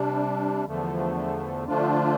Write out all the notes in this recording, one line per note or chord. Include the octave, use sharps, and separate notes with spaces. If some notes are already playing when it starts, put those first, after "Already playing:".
Already playing: C3 G3 D4
E2 D3 F3 A3
D3 F3 A3 D4 F4